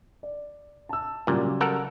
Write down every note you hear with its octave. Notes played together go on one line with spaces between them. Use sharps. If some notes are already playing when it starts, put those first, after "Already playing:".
D5
A5 E6
A#2 C#3 F#3 G3
A4 A#4 F#5